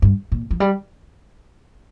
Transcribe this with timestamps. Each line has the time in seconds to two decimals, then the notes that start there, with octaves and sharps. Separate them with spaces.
0.02 G2
0.32 A#2
0.51 F3
0.60 G3